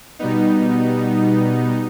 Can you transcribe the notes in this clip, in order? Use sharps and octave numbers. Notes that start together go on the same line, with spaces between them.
B2 G3 B3 D#4